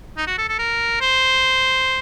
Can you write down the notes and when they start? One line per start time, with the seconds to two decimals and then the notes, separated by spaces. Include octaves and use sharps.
0.17 D#4
0.27 F#4
0.38 A4
0.49 A4
0.59 A#4
1.01 C5